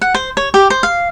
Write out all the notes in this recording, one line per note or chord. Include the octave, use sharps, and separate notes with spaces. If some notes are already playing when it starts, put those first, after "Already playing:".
F#5
C5
C#5
G4
C5
F5